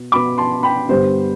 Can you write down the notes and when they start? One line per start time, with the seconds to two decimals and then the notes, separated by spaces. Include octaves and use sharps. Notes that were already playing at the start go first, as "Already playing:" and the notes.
Already playing: B2 B3
0.12 B2 B3 B5 D6
0.38 A5 C6
0.63 G5 B5
0.89 G2 D3 G3 B3 C5